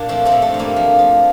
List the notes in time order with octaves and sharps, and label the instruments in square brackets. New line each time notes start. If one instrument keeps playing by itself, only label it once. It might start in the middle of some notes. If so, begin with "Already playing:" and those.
Already playing: [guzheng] A#2 D4
F3 A3 C4
A3 C4
G2
A3
G2
G3 A#3
F3
F3